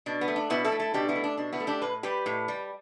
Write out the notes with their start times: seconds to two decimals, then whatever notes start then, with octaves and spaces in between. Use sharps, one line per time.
0.06 B2 D4
0.21 B3
0.28 A3
0.36 D4
0.50 B2 B3 E4
0.64 E4 A4
0.72 A3
0.80 E4 A4
0.94 B2 D4 G4
1.09 B3 E4
1.16 A3
1.24 D4
1.37 B2 D4
1.53 B3 E4
1.60 A3
1.67 D4 G4
1.82 A2 B4
2.03 G3 G4 B4
2.26 A2
2.48 G3